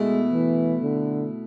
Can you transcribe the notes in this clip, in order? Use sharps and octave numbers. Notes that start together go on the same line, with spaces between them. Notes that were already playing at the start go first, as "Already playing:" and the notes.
Already playing: B2 G#3 A3 E4
E3
D3